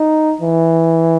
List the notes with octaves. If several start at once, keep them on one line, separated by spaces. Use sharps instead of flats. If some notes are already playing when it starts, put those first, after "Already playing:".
Already playing: D#4
E3